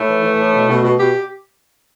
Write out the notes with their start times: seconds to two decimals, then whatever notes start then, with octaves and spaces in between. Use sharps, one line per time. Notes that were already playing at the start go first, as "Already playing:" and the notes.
Already playing: A2 A3
0.08 E3
0.22 E3
0.38 A2
0.52 B2
0.68 B2
0.83 B2
0.98 B2 G4